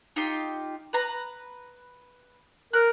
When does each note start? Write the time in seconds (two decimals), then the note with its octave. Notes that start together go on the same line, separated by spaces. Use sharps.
0.16 D#4 F4 G4
0.93 B4 A#5
2.73 A#4 F#6